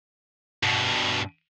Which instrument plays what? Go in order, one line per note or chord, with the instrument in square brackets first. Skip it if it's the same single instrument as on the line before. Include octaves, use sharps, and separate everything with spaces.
[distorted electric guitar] G2 B2